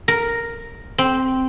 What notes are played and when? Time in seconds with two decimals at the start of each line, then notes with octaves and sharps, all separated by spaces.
0.08 A#4
0.98 C4